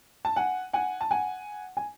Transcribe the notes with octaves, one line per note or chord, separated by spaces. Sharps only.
A5
F#5 G#5
F#5 G#5
A5
F#5 G#5
G#5